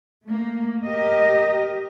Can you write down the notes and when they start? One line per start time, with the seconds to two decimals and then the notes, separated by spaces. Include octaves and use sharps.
0.25 A3 A#3
0.85 G4 A#4 D#5